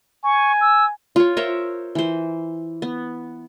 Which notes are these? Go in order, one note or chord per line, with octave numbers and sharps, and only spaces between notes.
G#5 C#6
E6
F4 C#5
A#4 C5 C#5 E5
E3 C5
B3